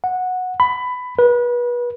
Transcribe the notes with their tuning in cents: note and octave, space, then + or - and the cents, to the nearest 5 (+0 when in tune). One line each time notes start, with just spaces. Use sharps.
F#5 -10
B5 +15
B4 -30